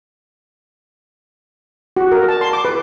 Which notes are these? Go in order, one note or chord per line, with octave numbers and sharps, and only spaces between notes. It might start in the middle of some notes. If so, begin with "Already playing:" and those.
F#4
A#4
A5
C6
D6
B4